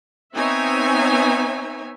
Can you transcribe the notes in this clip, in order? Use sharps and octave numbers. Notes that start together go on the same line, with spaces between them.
B3 C4 D#4 C#5 E5 G#5